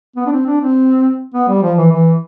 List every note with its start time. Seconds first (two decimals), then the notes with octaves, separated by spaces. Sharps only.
0.16 B3
0.26 D4
0.32 C4
0.47 D4
0.61 C4
1.34 B3
1.48 G3
1.63 F3
1.78 E3
1.92 E3